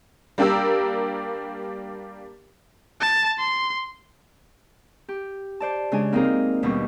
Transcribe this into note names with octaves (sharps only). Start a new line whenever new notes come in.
G3 A#3 D4 G4 A#4 E6
A5
C6
G4
C5 D5 A5
C#3 G#3 D4 G#5
A#3 C4 D#4 F4 G#4 A#4
F4
D#2 B2 G3 D4 F#4 C#6